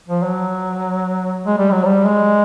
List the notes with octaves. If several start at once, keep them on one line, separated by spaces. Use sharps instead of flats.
F3
F#3
G#3
G3
F#3
G3
G#3